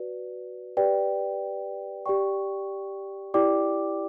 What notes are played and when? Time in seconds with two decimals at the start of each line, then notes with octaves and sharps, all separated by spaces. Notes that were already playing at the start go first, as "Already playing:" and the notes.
Already playing: F#4 B4 D5
0.77 G4 B4 D5 G5
2.06 G4 D5 G5 C#6
3.34 E4 G4 D5 G5 D6